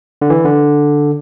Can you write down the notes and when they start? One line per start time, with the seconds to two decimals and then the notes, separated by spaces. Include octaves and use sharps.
0.22 D3
0.30 E3
0.44 D3